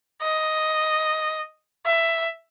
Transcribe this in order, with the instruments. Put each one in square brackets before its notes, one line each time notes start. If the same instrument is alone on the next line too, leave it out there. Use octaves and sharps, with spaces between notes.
[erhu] D#5
E5